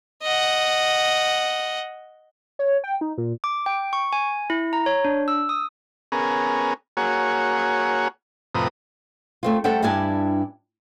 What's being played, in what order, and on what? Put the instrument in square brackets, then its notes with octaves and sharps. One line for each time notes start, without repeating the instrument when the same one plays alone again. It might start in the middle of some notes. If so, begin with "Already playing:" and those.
[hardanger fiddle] D#5 F#5
[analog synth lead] C#5
G5
D#4
A#2
[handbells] D6
G5
C#6
G#5
E4
A#5
C#5
D4
E6
D#6
[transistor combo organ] B3 C#4 G#4 A#4
A#3 F#4 G#4 C#5
F2 A2 C3 B4 A#5 D#6
[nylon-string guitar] A3 C4 F4
G3 A3 A4 C5 F#5 G5
G2 G3 D4 E4 G#5 A5